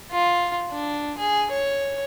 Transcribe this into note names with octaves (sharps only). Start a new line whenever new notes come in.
F4
D4
G#4
C#5